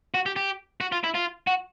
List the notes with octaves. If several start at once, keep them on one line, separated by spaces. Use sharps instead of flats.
F#4
G4
G4
F#4
F4
E4
F4
F#4